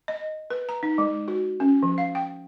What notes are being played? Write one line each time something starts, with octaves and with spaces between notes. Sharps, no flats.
D#5
B4
A#5
D#4
G#3
F#4
C#4
F3
F5
G5